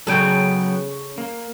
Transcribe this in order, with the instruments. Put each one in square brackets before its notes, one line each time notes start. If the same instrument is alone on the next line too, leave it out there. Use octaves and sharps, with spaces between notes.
[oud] C#3 A4 [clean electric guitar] F#3 B3 G5
[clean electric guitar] A#3